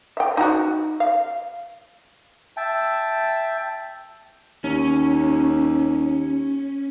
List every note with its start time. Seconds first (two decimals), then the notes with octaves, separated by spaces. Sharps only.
0.17 E5 G5
0.37 D#4 F#4
1.00 F5
2.57 E5 G5 A5
4.64 D#2 C#4